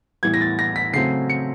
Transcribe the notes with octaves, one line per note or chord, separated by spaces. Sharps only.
A2 E3 G3 B3 G#6
A#6
A6
A#6
B6
C#3 F#3 A3 C4 C7
C#7